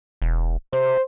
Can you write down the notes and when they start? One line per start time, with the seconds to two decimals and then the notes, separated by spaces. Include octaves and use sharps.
0.22 E1
0.73 C3 C5